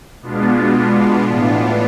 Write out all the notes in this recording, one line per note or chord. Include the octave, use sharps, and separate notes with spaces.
B2 G#3 B3 D4 F4
A2 E3 B3 D4 F4